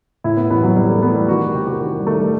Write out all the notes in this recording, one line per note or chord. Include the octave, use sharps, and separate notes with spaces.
A2 E4
B3
A1 B3
F#3
A1 G3
A3
E3 B3
G3
D#3 F#4
G4
C3 G4
F#4
D#3 F#4
G3
D#3 A3
G3